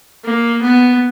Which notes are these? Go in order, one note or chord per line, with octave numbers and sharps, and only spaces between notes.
A#3
B3